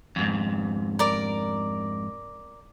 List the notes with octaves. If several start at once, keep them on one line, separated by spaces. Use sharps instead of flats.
F2 G#2
A#4 D5